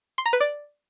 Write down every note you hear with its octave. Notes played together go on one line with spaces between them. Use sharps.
C6
A#5
B4
D5